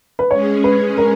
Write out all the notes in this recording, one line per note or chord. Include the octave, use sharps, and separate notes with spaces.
B4
G#3 C#4 G#4 C#5
B4
A#4